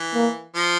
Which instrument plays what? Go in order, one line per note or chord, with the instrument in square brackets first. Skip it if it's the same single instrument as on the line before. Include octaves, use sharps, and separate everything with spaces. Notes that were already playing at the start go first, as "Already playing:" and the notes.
Already playing: [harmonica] E3
[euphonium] A#3
[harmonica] F3